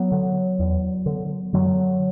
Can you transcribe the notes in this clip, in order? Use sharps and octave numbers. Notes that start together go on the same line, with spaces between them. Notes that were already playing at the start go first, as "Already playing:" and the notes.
Already playing: F#3 B3
D3
E2
D3
F#2 D3 F#3